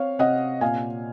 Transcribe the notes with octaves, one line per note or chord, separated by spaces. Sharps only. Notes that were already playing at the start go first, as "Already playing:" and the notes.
Already playing: C4 C#5 F5
C3 D#5 F#5
A#2 F5 G#5